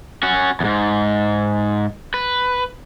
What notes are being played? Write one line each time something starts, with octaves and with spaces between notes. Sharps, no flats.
C#4 F#4
E2 G#2
B4